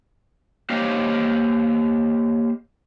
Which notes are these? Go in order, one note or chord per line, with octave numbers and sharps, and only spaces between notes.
A#3 G4 C5 C#5 D#5 F5